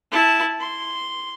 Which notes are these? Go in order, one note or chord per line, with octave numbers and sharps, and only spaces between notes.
E4 A5
C6